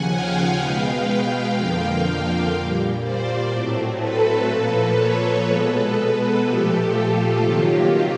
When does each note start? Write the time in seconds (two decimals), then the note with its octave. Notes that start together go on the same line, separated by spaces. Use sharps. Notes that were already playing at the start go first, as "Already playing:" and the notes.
Already playing: D#2 C#3 F3 F#5 G#5
0.10 F5 G5
0.59 B2 G#3 B3
1.08 F5 G5
1.56 F2 D3 F3 A#3
2.54 A#2 G3 A#3
3.03 C5 D5
3.51 A2 F#3 A3 C4
3.99 A4 B4
4.48 A#2 F3 A#3
4.96 B4 C#5
5.45 B2 G#3 B3 A4 B4
6.42 A#2 F3 A3 G4 A4
6.90 F4 G4
7.39 C3 D#3 F#3 A#3